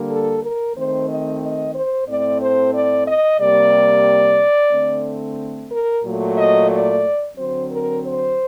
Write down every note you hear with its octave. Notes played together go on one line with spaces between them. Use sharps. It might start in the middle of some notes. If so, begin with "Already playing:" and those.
Already playing: D3 G3 A#3
A4
A#4
D#3 A3 C4 C5
D#5
D#5
C5
A2 A3 C4 D5
C5
D5
D#5
C3 G3 A#3 D5
D3 A3 C4
A#4
A#2 F#3 A3
D#5
D5
D3 F#3 C4 C5
A#4
C5